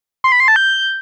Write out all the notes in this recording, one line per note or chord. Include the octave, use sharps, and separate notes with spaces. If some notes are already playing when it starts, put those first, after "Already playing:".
C6
B5
C6
A5
G6